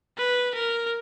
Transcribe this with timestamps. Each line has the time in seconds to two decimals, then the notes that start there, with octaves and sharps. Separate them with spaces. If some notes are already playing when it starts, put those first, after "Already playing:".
0.18 B4
0.55 A#4